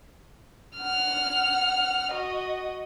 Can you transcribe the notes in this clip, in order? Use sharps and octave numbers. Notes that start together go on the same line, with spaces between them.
F#5 F6
F#4 D#5